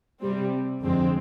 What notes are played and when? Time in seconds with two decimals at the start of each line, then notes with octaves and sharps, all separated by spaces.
0.20 C3 G3 C4
0.82 F2 D3 F3 G#3 C4